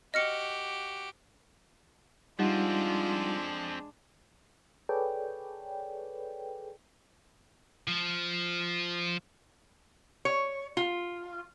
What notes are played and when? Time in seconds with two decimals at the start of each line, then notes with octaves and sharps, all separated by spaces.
0.14 F#4 G4 D#5 F6 C#7
2.39 F3 G3 G#3 C4 D4 D#4 F4 F#5
4.89 G#4 A4 B4 C#5 D5 G5
7.88 F3
10.25 C#5
10.77 F4